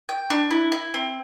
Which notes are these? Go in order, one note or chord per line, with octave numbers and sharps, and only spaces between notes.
G5
D4
E4
E4
C4